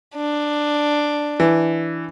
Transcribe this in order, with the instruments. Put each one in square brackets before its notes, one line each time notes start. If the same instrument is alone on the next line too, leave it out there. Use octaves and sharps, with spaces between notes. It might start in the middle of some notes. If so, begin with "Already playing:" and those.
[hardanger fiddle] D4
[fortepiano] E3